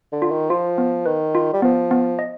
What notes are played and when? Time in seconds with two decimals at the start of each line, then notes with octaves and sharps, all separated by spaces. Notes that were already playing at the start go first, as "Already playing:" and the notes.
0.12 D3
0.22 F4
0.32 D#3
0.50 F3 F4
0.78 B3
1.06 D#3 B4
1.35 F4
1.53 G3
1.62 F3 B3
1.91 B3
2.19 D#5